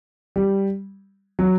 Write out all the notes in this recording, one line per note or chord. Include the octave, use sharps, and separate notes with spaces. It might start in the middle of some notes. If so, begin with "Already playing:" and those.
G3
F#3